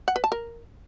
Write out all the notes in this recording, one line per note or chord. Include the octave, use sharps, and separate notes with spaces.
F#5
B4
A5
A#4